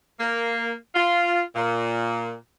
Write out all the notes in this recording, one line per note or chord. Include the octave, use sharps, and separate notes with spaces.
A#3
F4
A#2